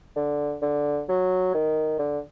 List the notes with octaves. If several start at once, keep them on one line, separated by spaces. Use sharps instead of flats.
D3
D3
F#3
D#3
D3